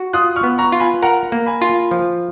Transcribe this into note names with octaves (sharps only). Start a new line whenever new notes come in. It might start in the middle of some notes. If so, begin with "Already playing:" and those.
Already playing: F#4
F4 D#6 F#6
C#6 F6
B3
A#5 C#6
F4
G#5 B5
A#4 F#5 A#5
A#3
G#5 B5
F4
F3